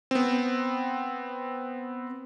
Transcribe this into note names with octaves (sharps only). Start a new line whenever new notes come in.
B3 C4